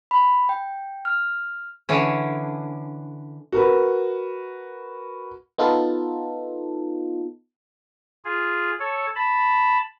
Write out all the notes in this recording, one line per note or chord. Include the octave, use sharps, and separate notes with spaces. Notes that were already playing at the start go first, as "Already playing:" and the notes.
B5
G5
F6
D3 E3 C#4
F#4 A#4 B4
B3 D#4 F4 A4
F4 G#4
A4 C#5
A5 B5